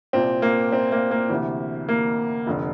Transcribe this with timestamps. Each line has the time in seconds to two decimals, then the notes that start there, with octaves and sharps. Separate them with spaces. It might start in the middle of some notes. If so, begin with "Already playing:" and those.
0.13 C2 A#2 C4
0.42 A#3
0.72 C4
0.92 A#3
1.11 A#3
1.30 D2 C3 E3
1.88 A#3
2.47 F1 F2 D3